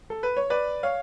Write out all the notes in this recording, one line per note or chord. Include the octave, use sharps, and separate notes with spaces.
A4
B4
C#5
B4 D5
C#5 F5